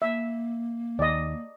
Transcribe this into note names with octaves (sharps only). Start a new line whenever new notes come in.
A#3 E5
D#2 D5 D#5